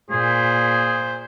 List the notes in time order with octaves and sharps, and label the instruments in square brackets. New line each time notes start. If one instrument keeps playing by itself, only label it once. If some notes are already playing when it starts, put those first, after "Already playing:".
[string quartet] A#2 [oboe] G#4 [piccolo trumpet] C5